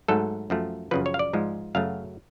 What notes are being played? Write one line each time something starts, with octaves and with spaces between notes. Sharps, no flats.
G#2 F#3 A3 A4
F#2 F3 A3
F#2 C#3 F3 B4
C#5
F5
D5
G#2 F3 G#3
F#2 C#3 F#3 A3 F5